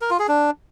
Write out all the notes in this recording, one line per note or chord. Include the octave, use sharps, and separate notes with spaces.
A#4
F4
G#4
D4